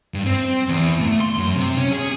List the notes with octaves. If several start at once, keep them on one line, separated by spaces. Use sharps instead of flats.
G2
C4
E2
A3
C6
F#2
C3
C#4
G#4